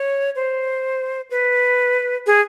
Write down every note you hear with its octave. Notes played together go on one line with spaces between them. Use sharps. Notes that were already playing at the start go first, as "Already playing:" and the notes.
Already playing: C#5
C5
B4
G#4